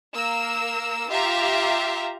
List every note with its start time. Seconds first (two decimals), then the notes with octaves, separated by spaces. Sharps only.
0.14 A#3 A#4 E6
1.10 F4 G4 E5 F5 A#5